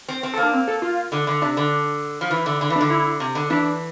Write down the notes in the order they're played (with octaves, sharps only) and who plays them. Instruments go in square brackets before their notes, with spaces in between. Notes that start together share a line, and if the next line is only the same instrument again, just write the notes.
[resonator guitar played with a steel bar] C4
C4
[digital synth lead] A4
[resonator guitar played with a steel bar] A#3
[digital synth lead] D4
C4
A4
F4
[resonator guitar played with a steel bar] D3
D3
[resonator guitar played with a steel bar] C3 [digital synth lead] D4
[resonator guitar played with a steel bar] D3
F3
E3
D3
D3
E3
[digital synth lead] D4
[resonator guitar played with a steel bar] D3
[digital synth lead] E4
[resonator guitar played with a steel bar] C3
D3
[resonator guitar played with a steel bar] E3 [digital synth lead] D4